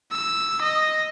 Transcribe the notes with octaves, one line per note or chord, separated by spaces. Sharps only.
E6
D#5